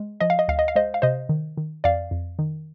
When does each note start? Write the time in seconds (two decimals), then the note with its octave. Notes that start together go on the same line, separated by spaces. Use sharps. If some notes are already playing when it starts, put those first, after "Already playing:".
Already playing: G#3
0.20 F3 D#5
0.30 F5
0.39 D#5
0.48 D2 F5
0.59 D#5
0.68 F5
0.76 G#3 C5 D#5
0.94 F5
1.02 C3 C5 D#5
1.29 D#3
1.57 D#3
1.84 F2 D5 F5
2.11 F2
2.39 D#3